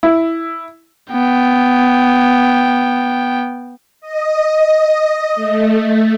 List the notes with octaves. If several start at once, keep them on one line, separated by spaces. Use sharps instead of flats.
E4
B3 G5
D#5
A3